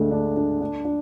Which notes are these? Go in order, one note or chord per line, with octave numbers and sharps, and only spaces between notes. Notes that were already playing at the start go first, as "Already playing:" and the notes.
Already playing: D2 D3 G#3 D4
D4
D4
D4
D4